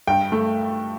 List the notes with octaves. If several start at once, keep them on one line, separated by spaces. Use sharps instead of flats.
G2 G5
A3